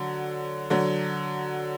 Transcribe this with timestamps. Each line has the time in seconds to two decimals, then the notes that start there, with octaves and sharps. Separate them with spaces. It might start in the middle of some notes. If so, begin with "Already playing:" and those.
Already playing: D3 F#3
0.70 D3 F#3